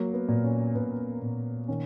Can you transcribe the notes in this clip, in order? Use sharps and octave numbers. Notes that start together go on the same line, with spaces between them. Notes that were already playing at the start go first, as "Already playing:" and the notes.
Already playing: F#3 A#3
B3
A#2
C#4
A#2 B3
A#2
D#3 C#4